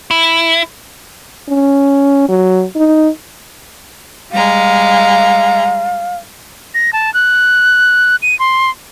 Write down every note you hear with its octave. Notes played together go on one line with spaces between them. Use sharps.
E4
C#4
F#3
D#4
G3 G#3 F5 A#5
A#6
A5
F#6
D#7
C6